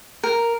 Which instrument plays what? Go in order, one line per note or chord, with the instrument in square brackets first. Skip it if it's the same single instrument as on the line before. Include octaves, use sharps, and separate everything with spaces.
[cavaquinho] A#4